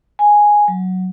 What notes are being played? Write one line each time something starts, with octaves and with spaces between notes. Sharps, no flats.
G#5
F#3